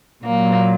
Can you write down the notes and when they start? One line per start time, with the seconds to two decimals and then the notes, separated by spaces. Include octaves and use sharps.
0.24 A#2 F#3 A#3